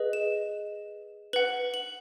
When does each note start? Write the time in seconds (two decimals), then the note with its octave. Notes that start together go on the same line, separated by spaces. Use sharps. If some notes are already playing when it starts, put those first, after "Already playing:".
Already playing: G#4 B4 D#5
0.13 E7
1.33 B4 F#5 F#7
1.74 F#7